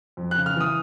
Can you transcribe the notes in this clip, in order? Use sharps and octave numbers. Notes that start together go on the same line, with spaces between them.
F2
F#6
C#3
F6
E3 D#6